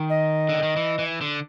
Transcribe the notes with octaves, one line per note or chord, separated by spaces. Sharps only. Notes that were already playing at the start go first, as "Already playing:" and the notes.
Already playing: D#3
D#5
D3
D#3
E3
E3
D3